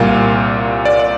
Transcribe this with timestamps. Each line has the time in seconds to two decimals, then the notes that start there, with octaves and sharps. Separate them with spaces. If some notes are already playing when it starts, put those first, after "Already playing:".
Already playing: C2 A#2 G3 A#3 F5
0.85 D5
0.99 D5